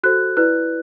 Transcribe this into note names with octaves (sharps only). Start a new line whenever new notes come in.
F#4 A4 C5 F#6
E4 B4 D5 F#6